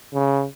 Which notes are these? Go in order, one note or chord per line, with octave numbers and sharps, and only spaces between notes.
C#3